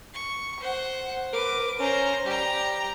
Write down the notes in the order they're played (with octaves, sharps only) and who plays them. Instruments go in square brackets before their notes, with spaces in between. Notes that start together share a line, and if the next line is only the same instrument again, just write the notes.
[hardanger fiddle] C#6
C5 F#5
[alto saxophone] A#4 [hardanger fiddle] B4 D6
[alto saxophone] C#4 [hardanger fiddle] C5 A#5
[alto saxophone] G3 [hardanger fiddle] G4 A#5